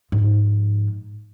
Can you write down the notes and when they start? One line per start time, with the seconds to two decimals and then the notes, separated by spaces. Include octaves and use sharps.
0.12 G#2 F3